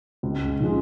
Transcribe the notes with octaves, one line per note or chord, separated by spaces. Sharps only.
C#2
C#3 F3 G#3